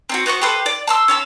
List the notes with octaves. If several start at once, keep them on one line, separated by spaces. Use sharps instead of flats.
C4 D4 F#4
B3 F#4 C5 C#6
G4 A4 B4 C5
D5
A5 C6 E6
C#4 F5 A5 E6